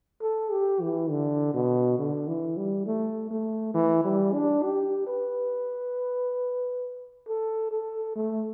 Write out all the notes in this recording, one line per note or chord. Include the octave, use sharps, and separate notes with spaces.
A4
G4
E3
D3
B2
D3
E3
G3
A3
A3
E3
G3
D4
G4
B4
A4
A4
A3